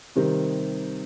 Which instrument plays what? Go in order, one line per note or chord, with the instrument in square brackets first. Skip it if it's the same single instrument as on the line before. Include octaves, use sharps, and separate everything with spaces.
[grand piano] C3 D#3 G3 C4